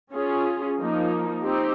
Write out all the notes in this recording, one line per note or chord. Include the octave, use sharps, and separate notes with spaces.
C#4 F4 G#4
F3 A#3 D#4
C4 D#4 G4